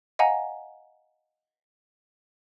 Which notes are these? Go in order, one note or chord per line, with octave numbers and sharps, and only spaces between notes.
D#5 F5 F#5 G#5 A#5